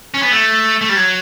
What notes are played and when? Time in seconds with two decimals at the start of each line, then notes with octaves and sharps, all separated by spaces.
0.14 C#4
0.22 B3
0.31 A3
0.81 A3
0.89 G3
0.96 F#3